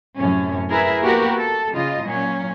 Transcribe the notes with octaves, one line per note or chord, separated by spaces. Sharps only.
F#2 A2 C3 C#4
E4 G#4 A#4 B4 E5
A#3 B3 F#4 G4 A#4 B4
A4
C#3 F4 D#5
A#2 F#3 C#4